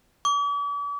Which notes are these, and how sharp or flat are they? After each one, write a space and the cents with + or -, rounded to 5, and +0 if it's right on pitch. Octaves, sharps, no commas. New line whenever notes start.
D6 -45